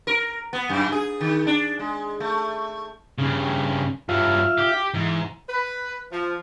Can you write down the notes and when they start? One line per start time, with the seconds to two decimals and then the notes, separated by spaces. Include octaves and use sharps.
0.07 A#4
0.53 B3
0.69 F#2
0.92 G#4
1.21 D#3
1.47 D4
1.79 G#3
2.20 A3
3.19 G2 C#3
4.09 G2 F#3 F4 E5 F5
4.59 G4
4.94 G#2 E3
5.48 B4
6.11 F3